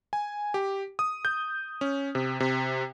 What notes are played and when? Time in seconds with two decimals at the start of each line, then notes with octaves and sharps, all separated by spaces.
0.13 G#5
0.54 G4
0.99 D#6
1.25 G6
1.81 C#4
2.15 C3
2.40 C3